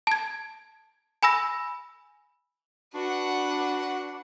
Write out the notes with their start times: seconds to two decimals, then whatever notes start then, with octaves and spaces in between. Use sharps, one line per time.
0.07 A5 G#6
1.23 G#5 B5 E6 A#6
2.95 D4 F#4 B4 F#5